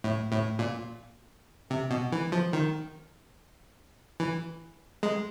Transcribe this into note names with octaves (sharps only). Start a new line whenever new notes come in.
A2
A2
A#2
C3
B2
E3
F3
D#3
E3
G#3